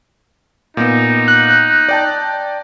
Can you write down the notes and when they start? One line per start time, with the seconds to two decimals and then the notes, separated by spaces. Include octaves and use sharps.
0.77 A#2 B3 D#4
1.28 F#6
1.89 D5 G5 A5